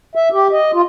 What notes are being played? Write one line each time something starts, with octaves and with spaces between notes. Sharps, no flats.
E5
G4
D#5
F4